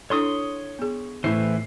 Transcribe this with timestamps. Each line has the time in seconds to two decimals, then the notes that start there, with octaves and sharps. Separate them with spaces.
0.10 D4 E4 A4 C#5 C6 D#6
0.79 B3 G#4
1.24 A2 E3 E4 C5 C7